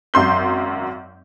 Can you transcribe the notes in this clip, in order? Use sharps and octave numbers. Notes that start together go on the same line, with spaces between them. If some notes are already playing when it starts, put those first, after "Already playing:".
G#1 F#2 C6 G6